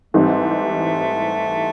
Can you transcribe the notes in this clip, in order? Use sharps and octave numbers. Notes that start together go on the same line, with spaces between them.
G#2 E3 G3 A3 C4 D#4